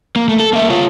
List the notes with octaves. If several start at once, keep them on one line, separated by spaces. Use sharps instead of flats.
A#3
A3
A4
A#3 E5
F4 C#5